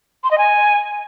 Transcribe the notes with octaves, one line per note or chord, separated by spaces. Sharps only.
C6
D#5
G#5